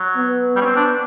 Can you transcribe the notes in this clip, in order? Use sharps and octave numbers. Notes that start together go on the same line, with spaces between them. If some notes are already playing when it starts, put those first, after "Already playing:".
Already playing: F#3
B3
G3
C#4
C4
D4